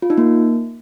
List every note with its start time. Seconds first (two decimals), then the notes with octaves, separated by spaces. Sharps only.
0.02 F4
0.10 D#4
0.18 A#3